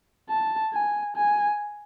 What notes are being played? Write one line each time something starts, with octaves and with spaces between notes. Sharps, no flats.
A5
G#5
G#5